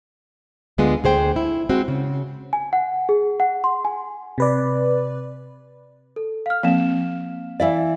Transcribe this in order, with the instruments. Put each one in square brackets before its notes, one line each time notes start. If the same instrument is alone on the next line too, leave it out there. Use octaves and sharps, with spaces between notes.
[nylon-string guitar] D2 D3 G#3 B3 F4 G#4
D2 G#4 C5 G5
E4
G#3 C4 F#4
C#3
[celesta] G#5
F#5
G#4
F#5
C6
G#5
[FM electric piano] C3 B4 D5
[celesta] A4
F5 F6
[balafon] F3 A#3 C4 [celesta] F5 E7
[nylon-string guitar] E3 E4 D5 [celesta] F5